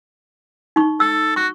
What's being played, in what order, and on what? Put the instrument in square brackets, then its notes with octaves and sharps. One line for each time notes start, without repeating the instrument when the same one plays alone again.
[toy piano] D#4 C#6
[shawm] A4 [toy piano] E6
[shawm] F#4 [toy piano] C#6